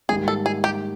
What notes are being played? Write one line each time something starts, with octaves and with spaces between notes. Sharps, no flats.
G#2 D#3 G3 A#3 G#4
A4
G#4
G4